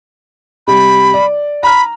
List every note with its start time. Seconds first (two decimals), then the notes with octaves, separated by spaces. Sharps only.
0.68 C3 G3 B5
1.14 D5
1.63 A#5 B5 F6